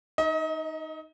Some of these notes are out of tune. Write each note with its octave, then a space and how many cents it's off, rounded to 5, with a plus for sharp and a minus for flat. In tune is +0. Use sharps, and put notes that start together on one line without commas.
D#4 +0 D#5 +35